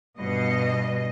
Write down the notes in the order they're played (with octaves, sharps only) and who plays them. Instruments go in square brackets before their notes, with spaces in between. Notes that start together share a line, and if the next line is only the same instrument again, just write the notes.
[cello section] G2 B2 D#5